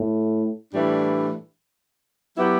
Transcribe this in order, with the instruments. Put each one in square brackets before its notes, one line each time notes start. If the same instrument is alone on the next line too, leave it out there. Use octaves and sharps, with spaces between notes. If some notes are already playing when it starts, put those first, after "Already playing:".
Already playing: [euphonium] A2
[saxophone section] A2 E3 G3 D4
F#3 B3 E4 G4